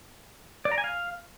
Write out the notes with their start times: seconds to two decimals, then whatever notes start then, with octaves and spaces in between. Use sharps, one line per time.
0.65 D5
0.72 A#5
0.78 G#5
0.84 F5